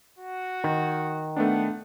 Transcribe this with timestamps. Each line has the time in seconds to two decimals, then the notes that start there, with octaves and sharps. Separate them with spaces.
0.19 F#4
0.64 D#3
1.36 A3 B3 D4 F#5